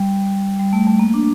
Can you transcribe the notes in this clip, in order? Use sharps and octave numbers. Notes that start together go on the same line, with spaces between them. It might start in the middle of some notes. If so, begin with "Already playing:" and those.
Already playing: G3
G3
A3
A3
A#3
D4